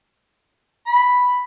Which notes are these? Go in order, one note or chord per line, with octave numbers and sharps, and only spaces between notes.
B5